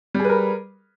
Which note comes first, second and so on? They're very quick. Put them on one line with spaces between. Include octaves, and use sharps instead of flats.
G3 G#4 B4 A#4